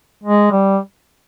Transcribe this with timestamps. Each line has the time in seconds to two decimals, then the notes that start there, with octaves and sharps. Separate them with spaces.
0.23 G#3
0.51 G3